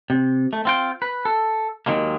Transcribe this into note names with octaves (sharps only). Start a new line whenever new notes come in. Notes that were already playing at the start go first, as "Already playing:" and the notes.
C3
A3
C4 F4 G5
B4
A4
D#2 A#2 D#3 F#3 G#3 A#3